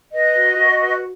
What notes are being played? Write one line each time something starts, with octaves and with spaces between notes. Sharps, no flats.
B4 D#5
F#4
F#4
B4